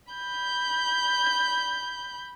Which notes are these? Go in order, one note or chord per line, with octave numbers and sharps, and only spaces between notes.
B5 G6